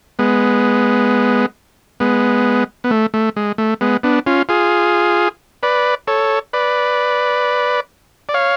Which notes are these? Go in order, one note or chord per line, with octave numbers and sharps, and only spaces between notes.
G#3 B3
G#3 B3
B3
A3
A3
G#3
A3
G#3 B3
B3 D4
C#4 F4
F4 G#4
B4 D5
A4 C#5
B4 D5
D5
C#5 F5